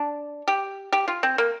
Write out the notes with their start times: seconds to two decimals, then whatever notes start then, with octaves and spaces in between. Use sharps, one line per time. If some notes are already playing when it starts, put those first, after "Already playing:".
Already playing: D4
0.48 G4
0.92 G4
1.08 F4
1.23 C4
1.38 A#3